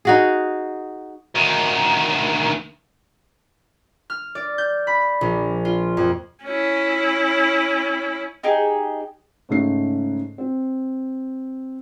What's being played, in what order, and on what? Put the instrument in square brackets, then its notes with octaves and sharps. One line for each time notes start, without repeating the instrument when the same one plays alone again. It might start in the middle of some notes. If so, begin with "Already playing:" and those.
[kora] D#4 F#4 G#4
[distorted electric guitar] D2 D#3
[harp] F6
D5
G6
B5
A#1
F4
F2
[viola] C#4 E4
[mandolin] D#4 G4 G#4 G5
[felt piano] G#2 C#3 A3 C7
C4